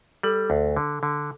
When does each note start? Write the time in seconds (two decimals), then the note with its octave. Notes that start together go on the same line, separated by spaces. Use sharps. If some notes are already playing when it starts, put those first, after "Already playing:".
0.23 G3 A4
0.50 D2
0.76 D3
1.03 D3